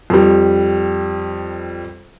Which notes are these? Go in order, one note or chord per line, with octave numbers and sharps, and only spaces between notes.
F2 G3